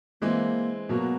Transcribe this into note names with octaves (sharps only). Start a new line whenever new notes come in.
E3 G#3 A#3 C4
B2 F#3 A#3 B3